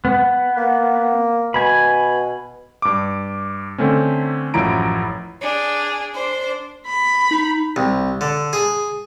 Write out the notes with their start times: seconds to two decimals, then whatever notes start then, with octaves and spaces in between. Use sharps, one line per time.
0.05 B3
0.57 A#3
1.54 B2 G#5 B5
2.82 G2 D6
3.78 D3 A3 C4 C#4
4.54 A1 F#2 F3 E4 A#5 D7
5.41 D4 G#4
6.14 D4 C5
6.86 B5
7.31 D#4
7.76 C2
8.21 D3
8.53 G#4